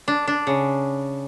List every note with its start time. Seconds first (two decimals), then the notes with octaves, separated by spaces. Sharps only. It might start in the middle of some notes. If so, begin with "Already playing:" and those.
0.08 D4
0.27 D4
0.47 C#3